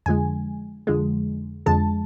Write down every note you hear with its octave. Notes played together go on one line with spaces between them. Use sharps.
F2 D3 F3 G#3 G#5
F2 D3 F3 G#3
F2 D3 F3 G#3 A5